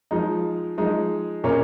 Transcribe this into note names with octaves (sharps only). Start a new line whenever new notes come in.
F3 G#3 D#4
F3 G#3 D#4
A#2 A#3 C#4